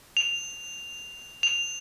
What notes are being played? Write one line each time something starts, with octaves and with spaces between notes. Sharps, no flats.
F7
F7